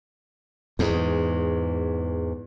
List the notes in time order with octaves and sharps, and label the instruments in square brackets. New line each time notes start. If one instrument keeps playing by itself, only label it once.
[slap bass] E2 G#2